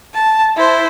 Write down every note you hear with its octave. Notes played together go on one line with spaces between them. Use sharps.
A5
E4 C5